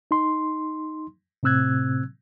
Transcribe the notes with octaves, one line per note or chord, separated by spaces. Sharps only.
D#4 C6
A2 C3 C4 E6 F#6 G#6